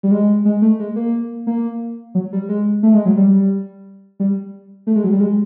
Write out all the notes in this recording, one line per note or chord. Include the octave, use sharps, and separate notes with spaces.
G3
G#3
G#3
A3
G#3
A#3
A#3
F#3
G3
G#3
A3
G#3
F#3
G3
G3
A3
G#3
F#3
G3
G#3